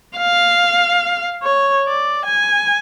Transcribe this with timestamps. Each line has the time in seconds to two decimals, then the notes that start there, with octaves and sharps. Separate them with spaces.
0.17 F5
1.43 C#5
1.87 D5
2.25 G#5